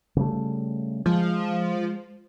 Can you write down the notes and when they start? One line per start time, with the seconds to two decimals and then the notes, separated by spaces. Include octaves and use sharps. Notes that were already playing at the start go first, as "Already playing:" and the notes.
0.16 C#3 G3 A3
1.06 F3 G#3